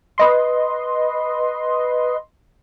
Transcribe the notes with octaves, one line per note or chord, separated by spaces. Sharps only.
B4 D#5 C6